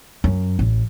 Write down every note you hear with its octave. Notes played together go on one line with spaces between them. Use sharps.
F#2
A1